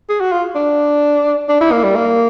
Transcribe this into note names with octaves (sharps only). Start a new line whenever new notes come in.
G#4
F#4
F4
D4
D4
E4
A#3
G3
A#3